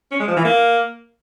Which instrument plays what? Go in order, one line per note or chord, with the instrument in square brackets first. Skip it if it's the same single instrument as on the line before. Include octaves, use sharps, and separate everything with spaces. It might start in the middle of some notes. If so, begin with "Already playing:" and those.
[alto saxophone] C#4
G#3
F3
E3
A#3